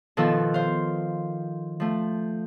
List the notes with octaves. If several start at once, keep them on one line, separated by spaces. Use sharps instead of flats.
B2 D#3 F3 F4 A4 E6
C5 F5
F3 A3